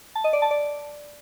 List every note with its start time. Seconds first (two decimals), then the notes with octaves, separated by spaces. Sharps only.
0.15 A5
0.24 D#5
0.33 D5
0.42 A5
0.51 D5